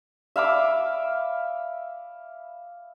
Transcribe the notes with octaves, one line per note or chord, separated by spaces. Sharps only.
E5 F5 B5 D6